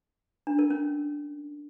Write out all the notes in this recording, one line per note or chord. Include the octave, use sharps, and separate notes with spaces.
D4
A#4
C#4